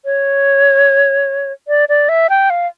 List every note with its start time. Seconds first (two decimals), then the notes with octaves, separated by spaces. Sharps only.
0.05 C#5
1.68 D5
1.89 D5
2.09 E5
2.30 G5
2.50 F5